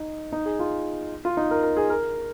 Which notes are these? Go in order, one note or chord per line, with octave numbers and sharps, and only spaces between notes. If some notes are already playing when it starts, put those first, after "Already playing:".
Already playing: D#4
D#4
G#4
F4
F4
D#4
A#4
A#4
G#4
A#4